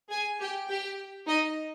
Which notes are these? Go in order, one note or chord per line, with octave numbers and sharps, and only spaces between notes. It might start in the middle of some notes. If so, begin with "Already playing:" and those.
G#4 G#5
G4 G5
G4 G5
D#4 D#5